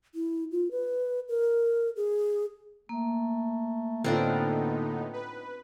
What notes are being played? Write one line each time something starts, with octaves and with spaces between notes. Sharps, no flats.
E4
F4
B4
A#4
G#4
A3 A#3
A2 D3 B3 C4 D4 D#4 F4
B4